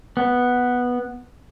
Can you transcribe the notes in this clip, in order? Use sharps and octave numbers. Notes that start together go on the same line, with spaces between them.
B3